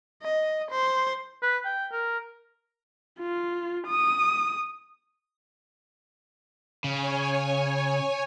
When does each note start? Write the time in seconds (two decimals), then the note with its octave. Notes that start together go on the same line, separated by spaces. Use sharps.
0.22 D#5
0.71 C5
1.42 B4
1.65 G5
1.92 A#4
3.19 F4
3.87 D#6
6.84 C#3 C#5 G#5